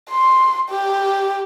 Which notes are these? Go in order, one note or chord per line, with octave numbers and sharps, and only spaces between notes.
C6
G4